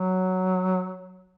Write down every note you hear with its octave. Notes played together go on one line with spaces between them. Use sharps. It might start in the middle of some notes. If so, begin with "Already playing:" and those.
Already playing: F#3